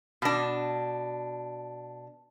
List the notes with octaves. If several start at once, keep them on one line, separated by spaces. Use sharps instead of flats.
B2 D4